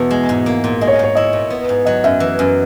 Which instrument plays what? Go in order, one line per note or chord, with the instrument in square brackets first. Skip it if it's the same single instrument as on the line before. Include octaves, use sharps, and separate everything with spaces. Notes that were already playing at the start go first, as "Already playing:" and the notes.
Already playing: [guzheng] E2 B2
G#3
G#2
A#3
A#2
[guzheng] G#3 [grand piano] D#5
[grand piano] C#5
D#5
[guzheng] G#2 [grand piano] C#5
[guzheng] E4 [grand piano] D#5
[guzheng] A#2
B3
G#2
[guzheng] F#3 [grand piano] D#5
[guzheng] F#2 [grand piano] E5
[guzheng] E3
F#2